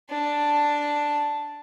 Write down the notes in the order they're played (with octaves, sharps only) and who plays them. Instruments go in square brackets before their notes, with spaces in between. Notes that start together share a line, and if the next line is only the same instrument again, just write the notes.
[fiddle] D4 A5